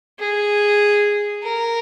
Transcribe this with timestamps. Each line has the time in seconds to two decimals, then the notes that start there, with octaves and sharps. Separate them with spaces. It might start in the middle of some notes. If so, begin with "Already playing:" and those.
0.19 G#4
1.43 A#4